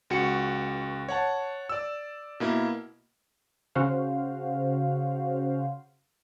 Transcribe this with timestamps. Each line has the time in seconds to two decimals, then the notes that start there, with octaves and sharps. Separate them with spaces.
0.10 C#2 F#4 C#7
1.09 C#5 F#5 A5
1.69 D5 E6
2.40 B2 A#3 E4
3.75 C#3 F#4 C5 F5